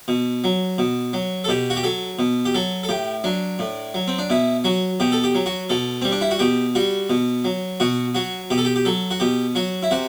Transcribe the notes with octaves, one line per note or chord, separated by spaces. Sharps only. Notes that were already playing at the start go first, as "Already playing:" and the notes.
B2
F#3
B2
F#3
A4
B2 G4
F#4
G4
F#3 A4
B2
G4
F#3 A4
A4
A2 G4
F#3 D4
A2
F#3
C4
D4
B2 E4
F#3 F#4
B2 G4
A4
G4
F#3
F#4
B2 A4
G3 C4
D4
E4
F#4
B2 G4
G3 F#4
B2
F#3
B2 F#4
F#3 F#4
B2 G4
A4
G4
G4
F#3 A4
F#4
B2 G4
F#3 F#4
E4
C3 F#4